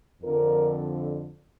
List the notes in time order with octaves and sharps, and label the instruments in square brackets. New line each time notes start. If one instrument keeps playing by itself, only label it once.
[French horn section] F2 D3 A#4